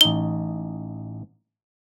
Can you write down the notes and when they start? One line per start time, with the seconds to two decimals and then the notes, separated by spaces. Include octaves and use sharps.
0.01 A1 D#4 G7